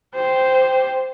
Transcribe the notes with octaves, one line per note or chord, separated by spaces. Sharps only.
G4 C5